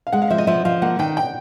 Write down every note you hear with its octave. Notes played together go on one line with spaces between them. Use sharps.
F5
G#3 F#5
F5
F3 E5
D#5
F3 E5
F3 F5
A#3 F#5
D#3 G5
G5